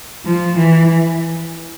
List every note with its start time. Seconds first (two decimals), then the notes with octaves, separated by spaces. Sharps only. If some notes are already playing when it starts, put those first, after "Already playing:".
0.26 F3
0.58 E3